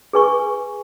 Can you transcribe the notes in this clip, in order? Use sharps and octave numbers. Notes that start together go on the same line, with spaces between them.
G#4 B4 G#5 C#6